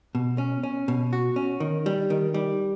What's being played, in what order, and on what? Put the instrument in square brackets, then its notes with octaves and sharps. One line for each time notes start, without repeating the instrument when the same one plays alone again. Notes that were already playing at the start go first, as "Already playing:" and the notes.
[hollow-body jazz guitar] B2
C#4
C#4
B2
F#4
C#4
D#3
G3
D#3
G3